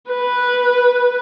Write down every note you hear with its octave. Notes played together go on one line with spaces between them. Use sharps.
B4